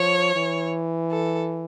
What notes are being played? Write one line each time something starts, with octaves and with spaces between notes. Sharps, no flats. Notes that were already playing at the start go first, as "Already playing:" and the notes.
Already playing: F3 C#5
E3
A4